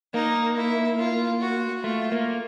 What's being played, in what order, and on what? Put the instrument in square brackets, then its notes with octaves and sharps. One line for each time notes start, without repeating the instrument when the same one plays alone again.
[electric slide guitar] A#3 [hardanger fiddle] D#4
[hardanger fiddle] E4
F4
F#4
[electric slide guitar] A3 [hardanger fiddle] F4
[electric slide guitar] A#3